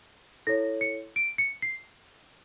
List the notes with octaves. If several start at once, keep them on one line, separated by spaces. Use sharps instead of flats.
E4 A4 C#5 A#6
C#7
D7
C#7
C7